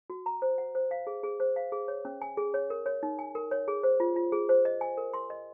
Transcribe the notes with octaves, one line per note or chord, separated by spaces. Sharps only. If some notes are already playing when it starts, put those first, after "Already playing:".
F#4
A#5
C5
F#5
C5
F5
G#4
G#4
C5
F5
G#4
C#5
C#4
G#5
G#4
C#5
A#4
C#5
D#4
G#5
A#4
C#5
G#4
C5
F4
F4
G#4
C5
D#5
G#5
A#4
C6
D#5